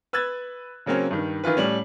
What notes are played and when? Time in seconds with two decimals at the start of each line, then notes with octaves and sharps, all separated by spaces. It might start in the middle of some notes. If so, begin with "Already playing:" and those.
0.13 B4 E6 F#6 G#6 A6
0.86 C#3 F#3 A#3 C4 C#4
1.11 G2 D#3
1.44 D#3 E3 F4 B4
1.57 A2 G3 C#4